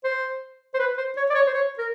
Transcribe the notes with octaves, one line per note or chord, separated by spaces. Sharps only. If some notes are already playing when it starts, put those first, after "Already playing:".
C5
C5
B4
C5
C#5
D5
C#5
C5
C#5
A#4